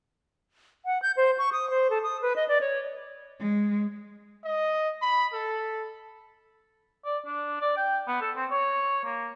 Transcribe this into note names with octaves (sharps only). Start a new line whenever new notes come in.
F#5
G6
C5
C#6
D#6
C5
A4
D#6
B4
D#5
D5
C#5
G#3
D#5
B5
A4
D5
D4
D5
G5
B3
A4
C4
C#5
A#3